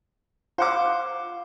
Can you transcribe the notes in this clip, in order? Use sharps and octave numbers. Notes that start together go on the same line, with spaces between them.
F4 C5 F#5 D6